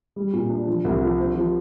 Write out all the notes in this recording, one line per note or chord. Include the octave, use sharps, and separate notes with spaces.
G3
A#2
D4
F3
C2
F3
C4
F3